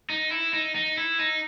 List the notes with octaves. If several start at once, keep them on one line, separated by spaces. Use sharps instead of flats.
D#4
E4
D#4
D#4
E4
D#4